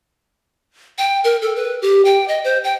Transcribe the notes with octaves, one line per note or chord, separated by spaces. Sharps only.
G5
A#4
A4
B4
G4
G5
D#5
C5
G5